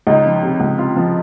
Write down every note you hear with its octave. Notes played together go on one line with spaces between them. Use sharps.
C#2 D#4
F3
C3
C#2
C3 F4
F3